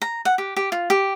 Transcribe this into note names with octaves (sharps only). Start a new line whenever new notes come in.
A#5
F#5
G4
G4
F4
G4